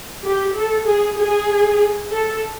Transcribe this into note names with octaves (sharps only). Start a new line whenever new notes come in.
G4
A4
G#4
G#4
A4